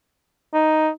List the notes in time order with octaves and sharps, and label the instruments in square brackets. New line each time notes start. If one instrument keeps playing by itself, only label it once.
[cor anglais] D#4